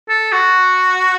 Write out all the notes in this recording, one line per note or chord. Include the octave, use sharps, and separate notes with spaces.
A4
F#4